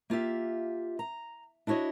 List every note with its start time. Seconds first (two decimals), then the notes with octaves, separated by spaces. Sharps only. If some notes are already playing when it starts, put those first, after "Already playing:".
0.10 A#3 F4 G4 E5
0.99 A#5
1.67 D4 E4 F#4 C#5 D#5